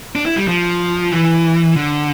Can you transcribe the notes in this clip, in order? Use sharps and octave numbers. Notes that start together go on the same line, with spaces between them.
D4
E4
G3
F3
E3
D3